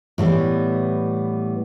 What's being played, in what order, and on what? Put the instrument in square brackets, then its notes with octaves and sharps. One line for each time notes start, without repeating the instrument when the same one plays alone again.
[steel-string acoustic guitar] A2 E3 G3 B3